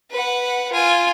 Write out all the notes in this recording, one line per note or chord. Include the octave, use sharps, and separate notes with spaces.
B4 F#5
F4 G#5